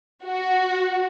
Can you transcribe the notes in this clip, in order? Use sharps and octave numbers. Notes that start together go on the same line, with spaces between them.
F#4